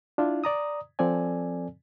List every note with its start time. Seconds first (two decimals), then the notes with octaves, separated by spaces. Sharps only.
0.18 D4 E4 F4
0.44 D5 A#5 D#6
0.99 F3 C4 A4 D5 G#5